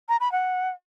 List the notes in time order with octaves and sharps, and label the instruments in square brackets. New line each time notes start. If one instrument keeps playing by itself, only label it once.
[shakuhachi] A#5
B5
F#5